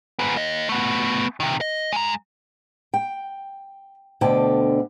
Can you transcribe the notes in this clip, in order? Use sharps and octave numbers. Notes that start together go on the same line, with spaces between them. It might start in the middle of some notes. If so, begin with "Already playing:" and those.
G#2 B3
A#3 D#5
A3 B3
C3 D#3
D#5
G#3 A#5
G5
D2 B2 D3 G5 A5